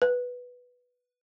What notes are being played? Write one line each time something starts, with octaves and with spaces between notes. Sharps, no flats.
B4